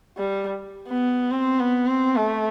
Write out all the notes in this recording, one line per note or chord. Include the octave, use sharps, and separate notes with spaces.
G3
B3
C4
B3
C4
A3